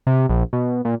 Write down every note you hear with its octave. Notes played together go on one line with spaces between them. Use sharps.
C3
A#1
B2
A#2